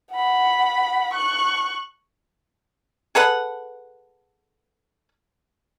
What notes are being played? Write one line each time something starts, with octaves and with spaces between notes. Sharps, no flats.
F#5 B5
C#6 F#6
G#4 A4 B4 F#5